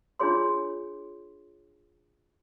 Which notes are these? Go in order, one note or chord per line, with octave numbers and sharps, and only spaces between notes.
D4 E4 F4 G#4 C#5 C6